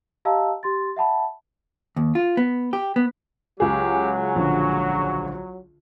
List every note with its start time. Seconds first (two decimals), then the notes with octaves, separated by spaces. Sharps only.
0.25 G4 D#5 F5 A5 A#5 E6
0.63 G4 C6 A6
0.97 E5 F#5 A5 B5
1.96 D#2
2.15 F4
2.37 B3
2.73 G4
2.96 B3
3.60 C#2 F#3 G4 G#4
4.36 A#1 D3 F#4